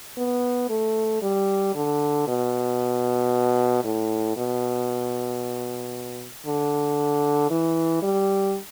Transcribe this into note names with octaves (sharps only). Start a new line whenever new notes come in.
B3
A3
G3
D3
B2
A2
B2
D3
E3
G3